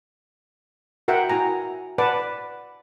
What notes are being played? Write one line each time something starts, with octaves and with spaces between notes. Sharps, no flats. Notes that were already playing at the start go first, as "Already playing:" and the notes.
F#4 A#4 E5 F#5 G5
E4 F#4 G#5 A#5
B4 D5 F#5 A5 D6